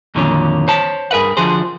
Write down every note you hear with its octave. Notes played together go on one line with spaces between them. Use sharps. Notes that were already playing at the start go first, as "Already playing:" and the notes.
F2 A#2 D3 D#3 F#3 C#4
C5 C#5 A5
G2 G#4 A#4 B4 F#5
D3 F3 F#4 G#4 C5